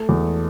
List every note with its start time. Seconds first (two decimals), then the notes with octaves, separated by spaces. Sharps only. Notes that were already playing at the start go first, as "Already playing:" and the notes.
Already playing: A3 A4
0.09 E2